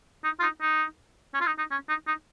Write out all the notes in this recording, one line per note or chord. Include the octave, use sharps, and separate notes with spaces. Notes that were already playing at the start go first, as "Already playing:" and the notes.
D#4
F4
D#4
D#4
C#4
F4
D#4
D#4
C#4
D#4
D#4